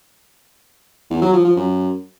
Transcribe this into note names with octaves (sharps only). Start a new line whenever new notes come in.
E2
F#3
F3
F3
F#2